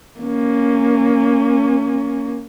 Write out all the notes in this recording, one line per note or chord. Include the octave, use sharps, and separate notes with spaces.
A#3 C#4